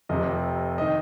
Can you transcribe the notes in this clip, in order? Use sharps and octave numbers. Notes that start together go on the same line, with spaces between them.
F1 F2 C3 D#5
D#3 D#5